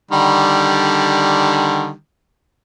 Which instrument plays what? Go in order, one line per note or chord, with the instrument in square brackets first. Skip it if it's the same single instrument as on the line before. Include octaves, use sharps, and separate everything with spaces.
[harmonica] D3 D#3 G3